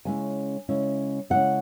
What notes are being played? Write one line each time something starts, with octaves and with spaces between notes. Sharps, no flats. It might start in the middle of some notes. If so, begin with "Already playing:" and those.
C#3 G#3 C#4 E4 G#5
C#3 G#3 C#4 E4
C#3 G#3 C#4 E4 F#5